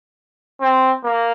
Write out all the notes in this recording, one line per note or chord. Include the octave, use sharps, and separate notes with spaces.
C4
A#3